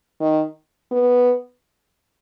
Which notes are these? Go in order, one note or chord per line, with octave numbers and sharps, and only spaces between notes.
D#3
B3